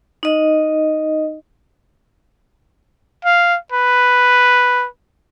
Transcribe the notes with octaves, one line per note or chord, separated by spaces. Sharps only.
D#4 D#5
F5
B4